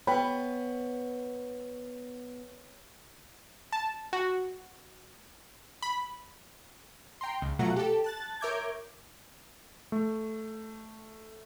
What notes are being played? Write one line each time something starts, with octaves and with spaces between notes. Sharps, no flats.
B3 C#5 G5 B5
A5
F#4
B5
G5 A#5 C6
C#2
B2 F#3 A3 F4 F#5 A#5
G4 A4
A5 F#6 A6
A#4 C#5 E5 D6 G6 G#6
A3